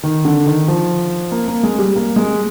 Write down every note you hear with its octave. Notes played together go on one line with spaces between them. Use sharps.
D#3
D3
D#3
F3
A#3
A#3
G#3
G3
A#3
G#3